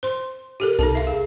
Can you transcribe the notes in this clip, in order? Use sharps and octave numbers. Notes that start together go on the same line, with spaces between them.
C5 C6
G4 A4 A#4
C2 D#4 A4 A5
E5 F5
G#4